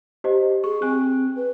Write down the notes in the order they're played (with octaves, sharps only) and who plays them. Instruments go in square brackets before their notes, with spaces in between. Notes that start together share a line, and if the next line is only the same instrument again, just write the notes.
[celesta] G4 C5 D#5
[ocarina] G#4 [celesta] C#6
[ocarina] C4 [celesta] G#5 F#6
[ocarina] B4